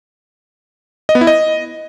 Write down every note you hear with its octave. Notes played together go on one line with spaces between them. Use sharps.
D#5
B3
E4
D#5